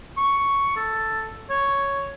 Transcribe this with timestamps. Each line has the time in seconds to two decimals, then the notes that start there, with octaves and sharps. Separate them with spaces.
0.17 C#6
0.76 A4
1.50 C#5